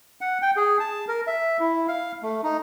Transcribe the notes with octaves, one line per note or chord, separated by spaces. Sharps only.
F#5
G5
G#4
A5
A#4
E5
E4
F5
A3
D#4